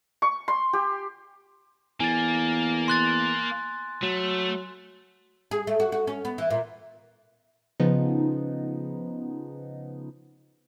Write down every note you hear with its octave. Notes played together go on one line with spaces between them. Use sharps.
C#6
C6
G4
E2 A#3 G#5 A6
C6 F#6 A6
F#3 A3
G#4
A3
F#4
F#4
C#4
B3
E3
A#2
C#3 F3 B3 D#4